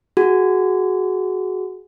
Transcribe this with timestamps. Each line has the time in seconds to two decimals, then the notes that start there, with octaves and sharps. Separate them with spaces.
0.17 F#4 G#4